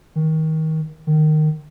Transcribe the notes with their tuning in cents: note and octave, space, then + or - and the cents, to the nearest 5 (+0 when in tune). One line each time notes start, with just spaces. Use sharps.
D#3 +25
D#3 -15